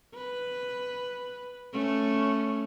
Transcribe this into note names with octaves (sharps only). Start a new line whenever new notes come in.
B4
A3 C#4